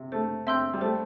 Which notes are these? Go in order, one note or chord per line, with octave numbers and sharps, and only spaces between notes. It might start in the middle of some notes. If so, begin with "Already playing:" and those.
Already playing: C3
A3 C5
C4 E5 C6 E6 G6
G3
A3 C5